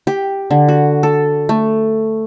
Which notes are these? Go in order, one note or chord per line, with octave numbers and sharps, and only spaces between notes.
G4
D3
F#4
A4
A3